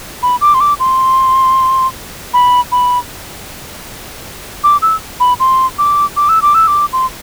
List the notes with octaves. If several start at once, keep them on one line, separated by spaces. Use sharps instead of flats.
B5
D6
C6
D6
C6
B5
B5
D6
E6
B5
C6
D6
D6
E6
D6
E6
D6
C6